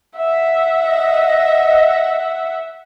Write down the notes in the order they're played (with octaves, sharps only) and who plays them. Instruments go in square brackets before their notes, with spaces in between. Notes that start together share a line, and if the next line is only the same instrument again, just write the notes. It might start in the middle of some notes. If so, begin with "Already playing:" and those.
[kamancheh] E5 F#5
[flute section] D#5